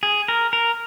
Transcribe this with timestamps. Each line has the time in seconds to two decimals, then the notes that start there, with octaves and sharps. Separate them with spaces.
0.03 G#4
0.28 A#4
0.53 A#4